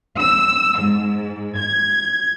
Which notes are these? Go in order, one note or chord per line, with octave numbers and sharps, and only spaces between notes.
E6
G#2
G#6